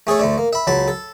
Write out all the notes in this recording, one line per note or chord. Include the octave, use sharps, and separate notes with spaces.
A3 G#4 A4 C#5
D2 A3 D4
A#3
E5 B5
C#2 F#3 A5 B5
A4